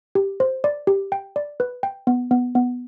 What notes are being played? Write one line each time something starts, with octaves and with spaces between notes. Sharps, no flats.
G4
C5
D5
G4
G5
D5
B4
G5
B3
B3
B3